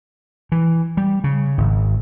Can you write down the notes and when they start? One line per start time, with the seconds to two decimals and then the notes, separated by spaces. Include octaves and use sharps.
0.52 E3
0.97 G3
1.24 C#3
1.58 G#1